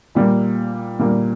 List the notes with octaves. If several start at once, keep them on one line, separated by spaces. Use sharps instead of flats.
A#2 G3 A#3
A#2 G3 A#3